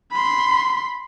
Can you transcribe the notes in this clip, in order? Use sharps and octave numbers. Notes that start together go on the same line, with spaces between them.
B5 C6